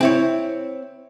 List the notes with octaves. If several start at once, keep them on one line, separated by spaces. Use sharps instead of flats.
C4 E4 C#5